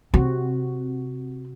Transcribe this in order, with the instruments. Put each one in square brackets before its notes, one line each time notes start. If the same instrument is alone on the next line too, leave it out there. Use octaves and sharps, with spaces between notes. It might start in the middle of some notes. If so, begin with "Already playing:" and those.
[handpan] C3 F#4 [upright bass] C4